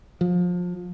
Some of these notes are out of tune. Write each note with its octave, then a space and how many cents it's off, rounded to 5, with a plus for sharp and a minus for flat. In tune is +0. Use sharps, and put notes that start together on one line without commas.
F3 +25